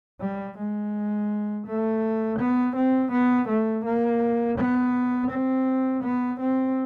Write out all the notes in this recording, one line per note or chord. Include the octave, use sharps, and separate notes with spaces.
G3
G#3
A3
B3
C4
B3
A3
A#3
B3
C4
B3
C4